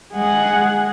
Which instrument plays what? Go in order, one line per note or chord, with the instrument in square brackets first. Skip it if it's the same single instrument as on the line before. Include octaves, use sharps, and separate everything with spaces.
[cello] G#3 [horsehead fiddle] G#4 F#5